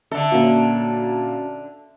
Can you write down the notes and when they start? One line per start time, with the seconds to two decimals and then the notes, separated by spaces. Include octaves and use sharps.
0.11 D3 A4 E5
0.32 A#2 A#3 C#4 F#4